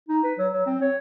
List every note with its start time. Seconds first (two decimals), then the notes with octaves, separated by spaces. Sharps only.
0.09 D#4
0.24 B4
0.38 F#3
0.52 F#3
0.66 C4
0.81 C#5